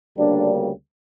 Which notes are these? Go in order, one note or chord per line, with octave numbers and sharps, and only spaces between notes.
D2 C#3 G3 A#3 D4